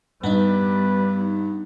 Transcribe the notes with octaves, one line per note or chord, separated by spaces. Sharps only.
G2 G3 B3 D#4 B4